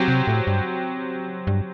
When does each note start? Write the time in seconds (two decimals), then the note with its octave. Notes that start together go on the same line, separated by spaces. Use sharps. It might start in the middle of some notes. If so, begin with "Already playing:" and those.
Already playing: F#3 C4 G4
0.08 C3
0.27 A2
0.47 G2
1.47 G2